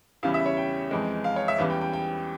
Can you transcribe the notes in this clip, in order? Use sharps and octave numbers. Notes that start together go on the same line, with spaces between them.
E2 C#3 G3 C#4 E4 F5
E5
C#5
G5
F2 E3 G#3
F5
C#5
E5
E2 E3 G3 C#4 F5
G5
G5
G5